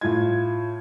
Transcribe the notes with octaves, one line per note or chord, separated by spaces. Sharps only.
A2 F4 G#6